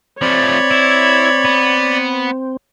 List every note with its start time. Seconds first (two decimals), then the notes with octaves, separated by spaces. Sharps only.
0.22 F3 A3 C4 C#5 D5 B5
0.71 E4
1.45 B3